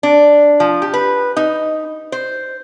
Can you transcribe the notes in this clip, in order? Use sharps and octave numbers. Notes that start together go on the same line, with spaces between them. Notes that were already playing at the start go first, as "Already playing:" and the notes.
D4
F3
G4
B4
D#4
C5